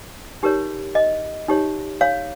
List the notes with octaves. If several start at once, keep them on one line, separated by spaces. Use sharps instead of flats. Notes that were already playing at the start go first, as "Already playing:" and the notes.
D#4 G4 A#4 C#5
D#5
D#4 G4 C#5
C#5 F5